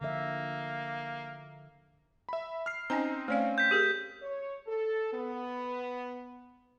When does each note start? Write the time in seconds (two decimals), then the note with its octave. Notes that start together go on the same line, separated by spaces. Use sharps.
0.01 D3 F3 A#3 E5
2.29 E5 B5
2.66 F6 C7
2.90 C4 C#4 D#4 G#5 A#5
3.28 A3 C4 C#4 D5 F5
3.58 G6 B6
3.71 G4 G#4 A#4
4.22 C#5
4.67 A4
5.13 B3